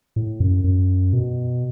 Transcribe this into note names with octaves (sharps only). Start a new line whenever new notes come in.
A2
F#2
F#2
B2